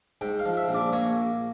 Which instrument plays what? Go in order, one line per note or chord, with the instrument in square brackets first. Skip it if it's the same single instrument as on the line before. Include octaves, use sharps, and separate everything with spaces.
[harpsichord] G#2 G5
F5
F3
E5
A#1
D5
A#3 C#5